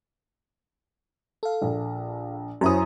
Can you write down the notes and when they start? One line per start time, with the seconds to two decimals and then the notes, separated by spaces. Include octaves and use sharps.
1.43 A4 F5
1.62 A#1
2.61 F#2 E4 C5 C#5 G#5 D#6